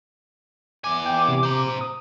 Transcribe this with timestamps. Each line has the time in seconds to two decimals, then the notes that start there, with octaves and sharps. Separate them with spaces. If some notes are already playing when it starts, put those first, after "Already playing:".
0.84 E2 G#5 D6
1.06 G5
1.28 C3
1.43 C5 A#5
1.81 D#6